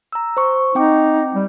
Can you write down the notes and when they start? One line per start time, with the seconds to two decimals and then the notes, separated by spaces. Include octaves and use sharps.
0.13 A#5 E6
0.37 C5 C#6
0.75 C4 D#4 G5 D6
1.35 G3